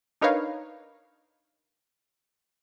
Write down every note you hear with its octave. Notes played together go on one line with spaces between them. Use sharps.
D4 D#4 A#4 B4 C#5 F5